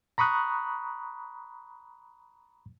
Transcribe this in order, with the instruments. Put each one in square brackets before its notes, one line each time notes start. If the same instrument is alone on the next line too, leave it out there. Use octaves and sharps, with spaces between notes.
[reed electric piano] A#5 B5 C#6 D#6 F#6